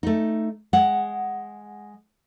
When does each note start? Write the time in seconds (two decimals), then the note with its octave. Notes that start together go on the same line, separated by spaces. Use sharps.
0.03 A3 D#4
0.73 G#3 F#5